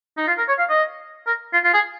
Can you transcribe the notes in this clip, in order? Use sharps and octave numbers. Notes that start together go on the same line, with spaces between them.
D#4
F4
A#4
C#5
F5
D#5
A#4
F4
F4
G#4